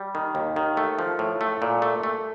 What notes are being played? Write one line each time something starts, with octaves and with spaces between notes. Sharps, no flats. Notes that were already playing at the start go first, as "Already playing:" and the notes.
Already playing: G3
D#3
D#2
D#3
A3
F3
A2
A3
A#2
A3
A3